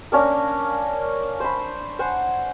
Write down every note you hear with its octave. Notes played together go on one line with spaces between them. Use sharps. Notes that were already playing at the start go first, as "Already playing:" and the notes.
A#3 C#4 D4 A#4
C5 B5
C5 F#5 G#5